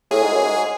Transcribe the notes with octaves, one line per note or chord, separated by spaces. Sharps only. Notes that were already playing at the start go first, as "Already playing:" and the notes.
A2 G#4
G#2
F#2
G#2